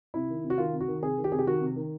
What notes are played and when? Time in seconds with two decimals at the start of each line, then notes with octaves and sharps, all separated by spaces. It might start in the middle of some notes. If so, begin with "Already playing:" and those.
0.14 C3 E4
0.30 D#3
0.44 C3
0.50 F#4
0.58 D#3 F4
0.73 C3
0.81 F#4
0.88 D#3
1.02 C3 G#4
1.18 D#3
1.24 G4
1.32 C3 G#4
1.38 G4
1.46 D#3 F#4
1.61 C3
1.76 D#3